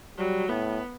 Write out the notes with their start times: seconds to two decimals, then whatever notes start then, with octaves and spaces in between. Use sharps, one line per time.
0.18 F#3 G3
0.48 A2 B3